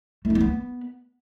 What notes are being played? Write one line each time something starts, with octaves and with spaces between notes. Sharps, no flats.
A3
D4
C4
B3